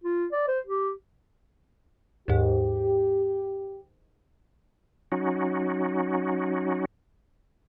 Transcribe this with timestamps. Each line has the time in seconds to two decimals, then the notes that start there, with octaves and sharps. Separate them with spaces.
0.04 F4
0.32 D5
0.48 C5
0.67 G4
2.28 D#2 G#2 G4
5.12 F#3 C#4 D#4 F#4